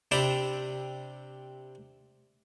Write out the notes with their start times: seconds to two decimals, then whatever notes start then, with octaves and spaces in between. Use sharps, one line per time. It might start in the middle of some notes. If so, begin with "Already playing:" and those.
0.11 C3 D4 G4 E5 A#5 B5